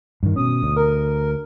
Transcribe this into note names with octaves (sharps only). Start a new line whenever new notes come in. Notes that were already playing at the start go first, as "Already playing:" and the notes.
G2 D#3
B2 C#4 D#6
D2
A#4